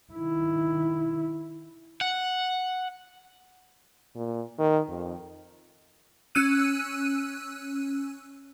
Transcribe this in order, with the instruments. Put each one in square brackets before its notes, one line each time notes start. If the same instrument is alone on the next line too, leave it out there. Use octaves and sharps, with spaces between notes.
[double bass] D#3 E4
[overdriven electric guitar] F#5
[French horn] A#2
D#3
F2
[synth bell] C#4 E6 F#6 D#7